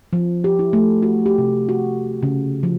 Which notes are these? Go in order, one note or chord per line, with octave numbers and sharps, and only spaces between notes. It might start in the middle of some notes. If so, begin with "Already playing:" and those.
F3
G4
E4
A3
F#4
G4
C3
F#4
C#3
F3